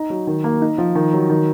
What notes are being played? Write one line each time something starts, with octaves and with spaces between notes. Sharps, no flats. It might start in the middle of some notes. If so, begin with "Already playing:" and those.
Already playing: D#4
F#3
D#3
A#3
D#4
F3
D#3
F#3
D#3